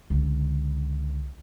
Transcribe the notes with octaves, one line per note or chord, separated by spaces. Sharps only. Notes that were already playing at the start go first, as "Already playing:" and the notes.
C#2 D3